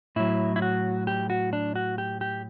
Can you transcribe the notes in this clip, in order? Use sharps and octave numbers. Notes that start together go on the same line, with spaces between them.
A2 F#3 E4
E4
F#4
G4
F#4
D4
F#4
G4
G4